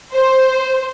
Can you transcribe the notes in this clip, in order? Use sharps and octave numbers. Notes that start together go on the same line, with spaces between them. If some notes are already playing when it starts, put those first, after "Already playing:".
C5